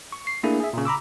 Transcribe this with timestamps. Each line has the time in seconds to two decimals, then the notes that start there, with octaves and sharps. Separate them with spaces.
0.12 C#6
0.27 C7
0.43 A3 A#3 D4 E4 G#4
0.60 G#4 E5
0.73 A#2 C#3
0.85 A#5 B5 D6 E6